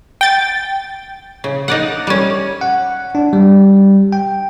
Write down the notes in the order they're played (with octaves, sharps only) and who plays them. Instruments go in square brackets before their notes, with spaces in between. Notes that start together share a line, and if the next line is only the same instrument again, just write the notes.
[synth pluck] G5 A6
[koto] C#3
D#4 D5 F#5
G3 C#4
[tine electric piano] F#5
D4
G3
G5